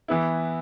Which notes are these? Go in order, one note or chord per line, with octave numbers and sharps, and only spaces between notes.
E3 B3 E4